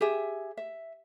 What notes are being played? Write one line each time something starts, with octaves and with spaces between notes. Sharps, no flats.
G4 G#4 E5
E5